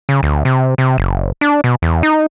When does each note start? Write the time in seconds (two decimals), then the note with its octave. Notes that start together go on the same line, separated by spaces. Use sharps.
0.09 C#3
0.23 D2
0.45 C3
0.78 C3
0.98 F#1
1.41 D4
1.64 B2
1.82 E2
2.03 D#4